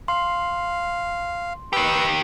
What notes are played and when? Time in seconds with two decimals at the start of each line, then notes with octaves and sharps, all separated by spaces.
0.08 F5 C6
1.73 D#3 G4 B4 E6